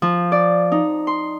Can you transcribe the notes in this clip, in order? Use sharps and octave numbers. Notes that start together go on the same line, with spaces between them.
F3
D5
D#4
C6